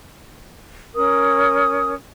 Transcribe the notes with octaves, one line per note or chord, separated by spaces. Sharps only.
C#4 A#4 D#6